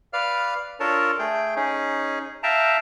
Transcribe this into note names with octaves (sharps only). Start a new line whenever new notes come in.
B4 D5 F5 F6
D4 F4 A4 A#4 C#5 A5
A3 G#4 G5
C#4 D#4 G#4
E5 F5 G5 A5 A#5